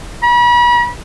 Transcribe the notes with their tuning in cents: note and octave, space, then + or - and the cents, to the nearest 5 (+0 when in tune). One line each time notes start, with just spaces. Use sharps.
B5 -40